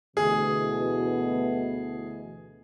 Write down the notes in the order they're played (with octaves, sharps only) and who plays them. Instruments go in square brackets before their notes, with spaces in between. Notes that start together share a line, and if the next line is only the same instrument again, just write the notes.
[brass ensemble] D2 B2 E3 [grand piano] G#4